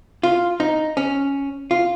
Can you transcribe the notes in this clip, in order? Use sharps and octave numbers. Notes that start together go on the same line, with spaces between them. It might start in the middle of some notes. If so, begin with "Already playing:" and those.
F4
D#4
C#4
F4